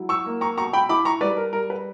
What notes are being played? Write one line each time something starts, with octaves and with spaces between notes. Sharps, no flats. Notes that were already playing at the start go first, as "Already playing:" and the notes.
Already playing: F#3 E4
C#6 E6
A#3
A#5 C#6
B2 A#5 C#6
G5 B5
E4 B5 D6
A#5 C#6
G3 B4 D5
A#4
G3 A#4
B4